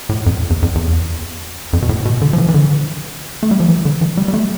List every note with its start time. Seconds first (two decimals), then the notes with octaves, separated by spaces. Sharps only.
0.09 A2
0.26 F2
0.50 E2
0.62 F2
0.75 E2
1.73 F2
1.82 B2
1.89 A2
2.05 B2
2.22 D3
2.33 F3
2.38 E3
2.48 E3
2.54 D3
3.43 A3
3.51 G3
3.60 F3
3.69 E3
3.85 D3
4.01 E3
4.17 G3
4.28 G3
4.34 A3